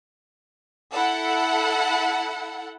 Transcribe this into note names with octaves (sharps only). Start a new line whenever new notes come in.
E4 A4 F#5